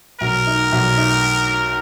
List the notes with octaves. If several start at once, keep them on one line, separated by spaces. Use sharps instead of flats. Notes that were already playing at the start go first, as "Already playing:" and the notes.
B1 A#4
D#4
B1
D#4